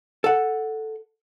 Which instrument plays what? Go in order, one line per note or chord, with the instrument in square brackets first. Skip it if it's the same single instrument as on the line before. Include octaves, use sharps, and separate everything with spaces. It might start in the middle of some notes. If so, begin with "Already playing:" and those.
[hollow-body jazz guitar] A4 F#5